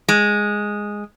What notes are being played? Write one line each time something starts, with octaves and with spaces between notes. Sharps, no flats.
G#3